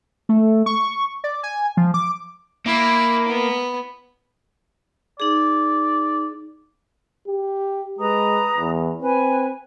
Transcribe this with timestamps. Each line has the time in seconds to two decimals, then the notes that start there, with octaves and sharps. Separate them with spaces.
0.29 A3
0.66 C#6
1.24 D5
1.43 G#5
1.77 F3
1.94 D6
2.66 A#3 E4
3.29 B3
5.20 D#4 G#4 D5
7.27 G4
7.99 G#3 B4 A#5 D#6
8.57 E2
9.01 C4 B4 G#5